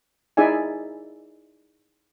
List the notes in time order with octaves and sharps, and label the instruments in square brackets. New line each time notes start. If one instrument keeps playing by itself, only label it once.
[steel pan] D#4 E4 G#4 D5 E5 G#5